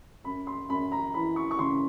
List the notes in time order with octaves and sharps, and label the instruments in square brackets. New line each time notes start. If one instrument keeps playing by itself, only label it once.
[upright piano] F#2 B5
C6
F#2 B5
A#5
E3 B5
C#6
C#6
C#3 C6